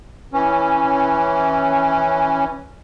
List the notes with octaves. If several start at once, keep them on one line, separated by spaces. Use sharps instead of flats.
E3 C#4